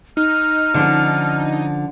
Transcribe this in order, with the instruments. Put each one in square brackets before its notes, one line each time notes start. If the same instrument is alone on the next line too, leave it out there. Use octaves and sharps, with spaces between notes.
[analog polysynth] D#4 [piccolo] F6
[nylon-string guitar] D3 F3 C#4